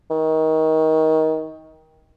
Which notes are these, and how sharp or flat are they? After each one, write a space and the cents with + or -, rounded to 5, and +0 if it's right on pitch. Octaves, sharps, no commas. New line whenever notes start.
D#3 +25